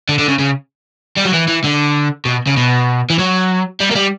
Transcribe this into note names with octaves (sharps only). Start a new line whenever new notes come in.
D3
D3
C#3
C#3
G3
F#3
E3
E3
D3
B2
C#3
B2
E3
F#3
G3
A#3
G3